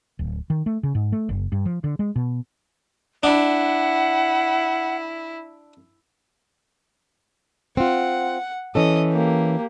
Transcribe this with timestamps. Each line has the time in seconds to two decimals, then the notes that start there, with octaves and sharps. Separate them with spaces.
0.19 D1
0.50 D#3
0.66 A3
0.83 C#3
0.95 G#2
1.12 A3
1.29 F#1
1.52 G2
1.66 F3
1.84 D3
1.99 G#3
2.16 B2
3.23 D4 E4 F#5
7.77 C4 F4 F#5
8.75 E3 C#4 A4 D#5
9.11 A#3 G4